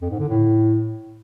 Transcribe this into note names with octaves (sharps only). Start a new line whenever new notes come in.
F2
G#2
D3
A2